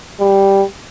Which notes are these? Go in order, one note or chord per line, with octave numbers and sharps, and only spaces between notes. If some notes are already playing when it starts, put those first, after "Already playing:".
G3